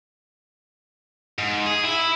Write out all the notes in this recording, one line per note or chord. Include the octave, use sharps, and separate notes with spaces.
G#2
G#4
E4